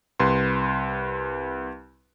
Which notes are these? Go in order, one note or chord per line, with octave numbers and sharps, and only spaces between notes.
C2 B4 C6